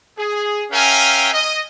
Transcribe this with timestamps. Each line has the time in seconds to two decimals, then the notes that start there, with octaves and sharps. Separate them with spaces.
0.18 G#4
0.72 C#4 A#4 E5 F5 G5 G#5
1.33 D#5